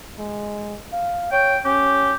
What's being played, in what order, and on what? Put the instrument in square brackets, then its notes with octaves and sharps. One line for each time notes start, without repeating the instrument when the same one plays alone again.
[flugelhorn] G#3
F5
[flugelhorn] C#5 [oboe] G5
[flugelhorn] C#4 [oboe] G4